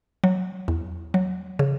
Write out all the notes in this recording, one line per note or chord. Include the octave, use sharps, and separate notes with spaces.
F#3
E2
F#3
C#3